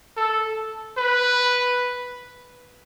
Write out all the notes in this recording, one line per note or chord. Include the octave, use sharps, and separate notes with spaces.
A4
B4